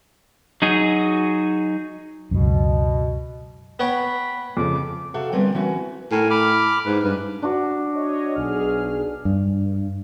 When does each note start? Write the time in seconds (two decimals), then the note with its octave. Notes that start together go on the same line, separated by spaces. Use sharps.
0.62 F#3 D#4 F#4 G#4
2.31 C#2 F#2 B2
3.80 B3 C#5 G5 B5
4.57 F2 C#3 D6
5.14 C3 F#4 A4 E5 F5
5.32 D2 G3 B3 C4 A#4 G#5
5.55 E3 C#4 F#4
6.12 A2 A#4 G#5
6.30 B5 D6 F6
6.86 G#2 B4
7.03 G2 B4
7.42 D4 F#4
7.94 C#5 D#5
8.35 B1 G#4 F6
9.25 G2